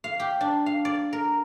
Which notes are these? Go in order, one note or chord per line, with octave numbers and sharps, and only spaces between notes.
F5
G4
D4
F5
D5
A#4